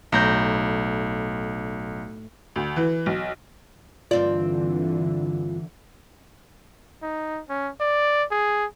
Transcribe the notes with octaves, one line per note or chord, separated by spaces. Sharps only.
B1 A2 A#5 G6
D2
E3
B1
G2 D3 E3 C4 F4 D5
D#4
C#4
D5
G#4